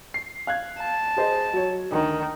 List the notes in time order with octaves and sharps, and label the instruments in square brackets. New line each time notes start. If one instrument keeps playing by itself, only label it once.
[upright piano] C7
F5 F#6 G#6
[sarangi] A5
[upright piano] G#4 C5 D#5
F#3 C#5
[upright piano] D2 [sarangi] D#3